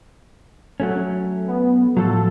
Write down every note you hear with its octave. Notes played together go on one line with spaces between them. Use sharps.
F#3 A3 C#4
B3
A2 F3 F#3 A4